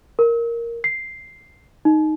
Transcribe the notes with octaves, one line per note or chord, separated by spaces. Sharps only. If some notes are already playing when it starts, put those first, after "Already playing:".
A#4
C7
D#4